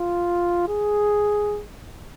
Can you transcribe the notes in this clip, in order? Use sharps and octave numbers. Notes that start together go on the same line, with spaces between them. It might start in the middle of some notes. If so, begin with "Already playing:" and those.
Already playing: F4
G#4